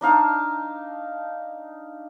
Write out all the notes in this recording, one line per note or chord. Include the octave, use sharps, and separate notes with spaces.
D4 D#4 F5 A5